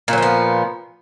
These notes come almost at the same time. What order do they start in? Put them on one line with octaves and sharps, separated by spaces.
A#2 F#3 F3 B3